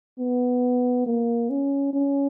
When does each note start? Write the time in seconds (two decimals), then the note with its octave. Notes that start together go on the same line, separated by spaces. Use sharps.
0.19 B3
1.06 A#3
1.50 C#4
1.93 C#4